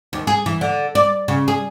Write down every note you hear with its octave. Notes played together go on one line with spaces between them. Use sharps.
D#2
G#4
E3
D3
D5
C#3
G#4